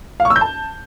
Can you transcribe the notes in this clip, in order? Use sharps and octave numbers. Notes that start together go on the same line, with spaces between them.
F5
C#6
E6
G6
A5